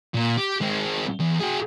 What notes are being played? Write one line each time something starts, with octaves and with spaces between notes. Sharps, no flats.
A#2
G4
G#3 C4
E2
F#4 G#4